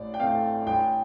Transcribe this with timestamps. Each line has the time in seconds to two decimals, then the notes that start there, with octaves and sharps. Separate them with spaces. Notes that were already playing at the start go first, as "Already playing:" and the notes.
Already playing: A1 D5
0.14 G5
0.20 A2 A3 C4 F5
0.67 A1 G5